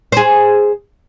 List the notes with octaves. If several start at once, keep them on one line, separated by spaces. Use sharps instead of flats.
G#4 C5